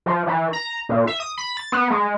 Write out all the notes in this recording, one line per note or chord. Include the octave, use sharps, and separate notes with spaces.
F3
E3
A#5
A#2
E5
D#6
B5
A6
B3
G#3